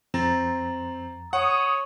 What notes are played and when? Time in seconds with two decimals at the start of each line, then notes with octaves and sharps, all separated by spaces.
0.14 F2 C4 A#5 A6
1.33 C#5 F#5 D#6